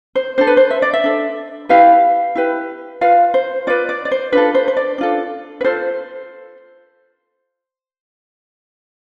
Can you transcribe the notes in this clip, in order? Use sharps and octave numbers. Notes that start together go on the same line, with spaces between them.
C5
D4 A4 C5
B4
C5
E5
D5
E5
D4 A4
E4 G4 B4 F5
E4 G4 B4
F4 B4 F5
C5
F4 B4 D5
D5
D5
C5
D4 F4 A4 B4
C5
C5
D5
D4 F4 A4
B4
F4 A4 C5